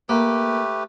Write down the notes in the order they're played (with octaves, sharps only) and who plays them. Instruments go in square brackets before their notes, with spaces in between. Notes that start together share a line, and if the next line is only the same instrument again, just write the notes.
[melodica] A3 G4 B4 [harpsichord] A#3